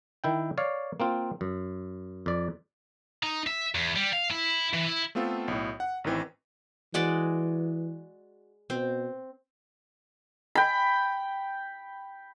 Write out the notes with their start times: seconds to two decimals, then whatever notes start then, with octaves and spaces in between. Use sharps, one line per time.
0.24 D#3 E4 G5
0.58 C#5 D5 F5
1.00 A#3 C4 F4
1.41 F#2
2.26 F2 D5
3.23 D#4
3.47 E5
3.75 E2
3.96 G3
4.13 F5
4.31 E4
4.73 E3
4.86 E4
5.15 A3 B3 C4 F4 A4
5.48 B1 A2
5.80 F#5
6.04 A1 D#3 E3 C4
6.94 E3 G#3 F#4 D5
8.70 B2 C4
10.55 G5 B5